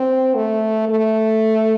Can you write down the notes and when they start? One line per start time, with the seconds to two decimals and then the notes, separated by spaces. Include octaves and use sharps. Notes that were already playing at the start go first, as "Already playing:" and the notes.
Already playing: C4
0.35 A3
0.89 A3